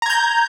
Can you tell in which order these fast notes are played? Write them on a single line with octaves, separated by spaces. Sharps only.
A#5 G#6 G6